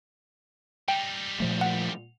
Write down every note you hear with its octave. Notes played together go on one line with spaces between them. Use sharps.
G3 D#4 G5
A#2 F3 A3
F#5